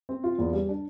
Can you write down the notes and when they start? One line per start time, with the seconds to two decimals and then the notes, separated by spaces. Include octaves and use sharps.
0.09 C4
0.24 F4
0.39 E2
0.53 G3
0.69 D4